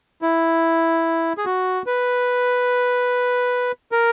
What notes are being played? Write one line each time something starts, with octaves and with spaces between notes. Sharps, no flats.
E4
G#4
F#4
B4
A#4